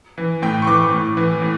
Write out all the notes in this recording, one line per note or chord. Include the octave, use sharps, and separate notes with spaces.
E3
A2 G5
C#6
E3 D6
A2
E3
A2